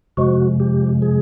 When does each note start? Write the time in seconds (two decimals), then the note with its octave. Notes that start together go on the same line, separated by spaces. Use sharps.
0.17 F2 C3 F3 G#3 F#4
0.60 G4
1.02 G#4